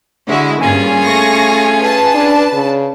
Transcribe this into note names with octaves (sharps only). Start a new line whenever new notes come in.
D3 G#3 E4 F#4
G2 A#3 C#4 F4 G#4 G#5
A3 C#6 A#6
B4 A5
D4
C#3